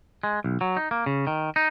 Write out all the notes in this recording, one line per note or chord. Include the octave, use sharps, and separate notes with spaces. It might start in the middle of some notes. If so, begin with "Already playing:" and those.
G#3
B1
F#3
D#4
A#3
C#3
D#3
D#4